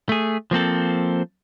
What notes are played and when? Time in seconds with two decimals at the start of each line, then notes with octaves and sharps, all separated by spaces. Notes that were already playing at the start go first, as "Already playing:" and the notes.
0.09 A3 G#4
0.51 F3 A#3 C4 A4